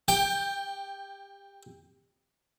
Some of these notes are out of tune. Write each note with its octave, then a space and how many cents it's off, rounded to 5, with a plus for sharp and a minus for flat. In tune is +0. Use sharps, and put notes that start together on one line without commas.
G4 +25 G5 +5